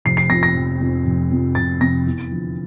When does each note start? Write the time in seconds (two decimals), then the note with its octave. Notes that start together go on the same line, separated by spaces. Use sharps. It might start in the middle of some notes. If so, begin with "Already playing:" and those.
0.05 F1 C7
0.17 C7
0.30 F2 C3 A#6
0.43 A#6
0.56 F1
0.81 F2 C3
1.06 F1
1.31 F2 C3
1.55 F1 A6
1.81 F2 C3 A#6
2.06 E2
2.30 D3 F3